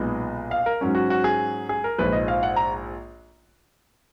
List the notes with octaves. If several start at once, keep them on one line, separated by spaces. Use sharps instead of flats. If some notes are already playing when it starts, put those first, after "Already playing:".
Already playing: B1 A#2 G#3 B3 D#4
F5
A#4
G#2 F#3 C#4
F#4
F#4
G#4
G#4
A#4
A#1 G#2 F3 B4
D#5
F5
F#5
A#5